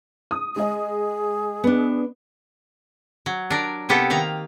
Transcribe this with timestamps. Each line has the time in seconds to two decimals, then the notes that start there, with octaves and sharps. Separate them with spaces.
0.31 D#6
0.56 G#3 G#4 D#5
1.64 B3 D4
3.26 F#3
3.50 D4 A#4 D5
3.89 C3 A#3 B3 G4 A4
4.10 D#3 A#3 F5 A#5